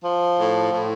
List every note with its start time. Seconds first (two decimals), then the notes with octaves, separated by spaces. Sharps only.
0.02 F3
0.37 A2
0.72 A2